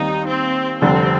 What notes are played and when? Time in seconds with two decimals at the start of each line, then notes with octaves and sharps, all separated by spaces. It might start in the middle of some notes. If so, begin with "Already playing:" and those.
Already playing: D#2 D#3 G3 C4 D#4
0.29 C4
0.81 F1 F2 D3 G3 C4